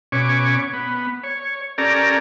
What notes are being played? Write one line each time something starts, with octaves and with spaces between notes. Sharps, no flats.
B2 C#4 C#5 D6
B3
C#5
C#4 G4 A4 A#4 D5 A#5